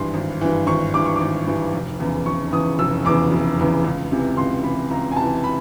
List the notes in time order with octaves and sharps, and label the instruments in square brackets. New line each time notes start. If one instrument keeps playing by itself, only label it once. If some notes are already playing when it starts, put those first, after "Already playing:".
Already playing: [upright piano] G#1 G2 E3 C6
G#1
G2 E3
G#1 C#6
G2 E3 D6
C#6
G#1 D6
G2 E3
F1
E2 C#3 E3
F1 C#6
E2 C#3 E3 D#6
F1 E6
E2 C#3 E3 D6
F1
E2 C#3 E3
C#2
C3 E3
C#2 C6
C3 E3 B5
C#2 A#5
G#5
C3 A5
E3
B5